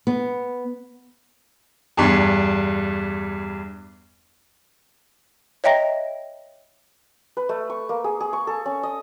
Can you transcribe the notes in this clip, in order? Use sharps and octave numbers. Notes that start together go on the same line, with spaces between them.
B3
E2 G2
C#5 D#5 E5 G5 A#5 A#6
B4
A3
C#6
A#3
G#4
G#4
C#6
A4
C#4
D#5